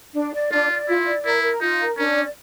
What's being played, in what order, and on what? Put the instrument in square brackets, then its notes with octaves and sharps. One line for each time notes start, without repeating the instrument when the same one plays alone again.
[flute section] D4
D5
[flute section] D4 [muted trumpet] F4
[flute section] D5
[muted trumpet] E4 [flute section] F4
[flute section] D5
[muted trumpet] E4 [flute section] A#4
[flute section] A#4
[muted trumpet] D#4 [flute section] F4
[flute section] A#4
[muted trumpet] C#4 [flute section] D4
[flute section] D5